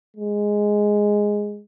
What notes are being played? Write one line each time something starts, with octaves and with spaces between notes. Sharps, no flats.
G#3